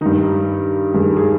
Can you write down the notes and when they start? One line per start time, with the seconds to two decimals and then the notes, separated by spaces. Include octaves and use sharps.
0.01 G2 D#3 D#4
0.94 G2 D#3 G#4
1.17 G#4